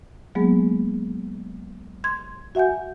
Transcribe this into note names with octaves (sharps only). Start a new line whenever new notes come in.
F#3 G#3 A#3 B3 G#4
C6 G#6
F#4 E5 F#5 G#5 G6